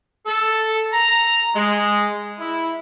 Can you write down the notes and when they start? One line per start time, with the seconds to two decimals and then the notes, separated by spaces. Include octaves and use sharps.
0.26 A4
0.93 A#5
1.55 G#3
2.40 E4